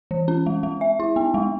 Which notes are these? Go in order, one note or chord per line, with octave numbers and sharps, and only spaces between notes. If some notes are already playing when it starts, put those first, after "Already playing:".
E3
C#4
G#3
G#3
E5
E4
B3
G#3